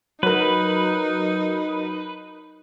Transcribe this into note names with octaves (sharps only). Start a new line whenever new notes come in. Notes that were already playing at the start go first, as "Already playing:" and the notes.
F#3 D#4 A#4 B4